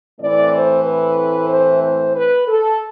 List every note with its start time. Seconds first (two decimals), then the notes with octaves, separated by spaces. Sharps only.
0.19 A2 E3 A3 C4 D5
0.52 C5
0.84 B4
1.49 C5
1.82 C5
2.14 B4
2.47 A4